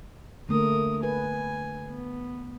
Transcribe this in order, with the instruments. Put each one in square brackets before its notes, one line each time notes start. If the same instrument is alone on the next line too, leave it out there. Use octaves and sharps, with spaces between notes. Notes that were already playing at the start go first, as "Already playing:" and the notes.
[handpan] D3 A3 A#3 [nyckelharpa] A#4 D#6
[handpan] B4 [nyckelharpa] G#5
[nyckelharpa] B3